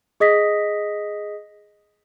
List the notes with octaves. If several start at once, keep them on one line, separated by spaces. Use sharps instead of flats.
G#4 D#5 D#6 A#6 B6